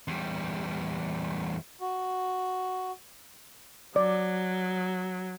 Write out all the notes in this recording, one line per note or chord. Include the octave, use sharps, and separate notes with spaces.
E2 G3
F#4
F#3 D5